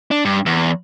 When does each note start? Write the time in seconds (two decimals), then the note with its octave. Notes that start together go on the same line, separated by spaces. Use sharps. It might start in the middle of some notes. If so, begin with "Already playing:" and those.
0.11 D4
0.25 G2
0.46 E2